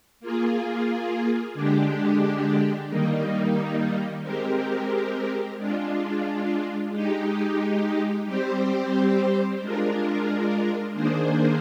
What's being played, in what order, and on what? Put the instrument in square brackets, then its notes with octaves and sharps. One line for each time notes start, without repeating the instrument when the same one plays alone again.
[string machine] A#3 F4 G#4
D3 G#3 D4 G4
D#3 G3 A#3 D#4
G#3 C4 G4 A#4
G#3 D4 F4
G#3 D#4 G4
G3 C4 G4 C5
G#3 D4 F4 A#4
D#3 A#3 D4 G#4 C5